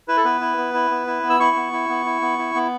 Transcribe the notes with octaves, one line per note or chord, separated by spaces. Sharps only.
E4 B4
A4
B3 B4
E4
B3
E4
B3
E4
B3
E6
E4 C#6
B3
E4
B3
E4
B3
E4
B3